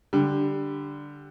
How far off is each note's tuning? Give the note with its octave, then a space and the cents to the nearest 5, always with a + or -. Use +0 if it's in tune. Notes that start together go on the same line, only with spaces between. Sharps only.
D3 +0 G3 +0